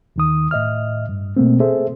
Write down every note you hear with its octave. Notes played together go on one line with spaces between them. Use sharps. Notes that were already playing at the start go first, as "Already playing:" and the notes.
D#2 D#3 D#6
A2 D#5 E5 F6
G2
B2 A3 A#3 C4
G#4 A4 C5 E5